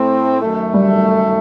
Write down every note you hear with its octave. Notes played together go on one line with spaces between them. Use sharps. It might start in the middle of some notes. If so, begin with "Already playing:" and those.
Already playing: A2 A3 C4
F#2 D#3 A3
G3